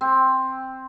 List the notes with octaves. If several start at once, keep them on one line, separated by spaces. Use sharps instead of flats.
C4